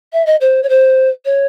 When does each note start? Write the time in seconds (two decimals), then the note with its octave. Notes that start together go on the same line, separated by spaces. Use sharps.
0.13 E5
0.26 D#5
0.41 C5
0.63 C#5
0.69 C5
1.25 C#5